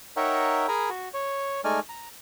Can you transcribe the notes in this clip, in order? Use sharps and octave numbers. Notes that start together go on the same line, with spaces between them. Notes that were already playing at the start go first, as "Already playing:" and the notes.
D#4 A#4 C#5 E5 F#5 G5
G#4 A#4 G#5 A#5 B5
F#4
C#5
G#3 A3 D#4 D5 G#5 F6
A#5